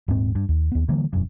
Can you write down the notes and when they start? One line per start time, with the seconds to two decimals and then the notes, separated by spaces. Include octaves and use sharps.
0.08 D#1 G#2 C4
0.35 G2
0.49 D#2
0.72 D#2 B3
0.88 D3 E3 G3 A#3
1.13 E1 F#2